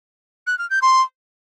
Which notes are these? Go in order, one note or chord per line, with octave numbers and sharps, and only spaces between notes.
F#6
F6
G6
C6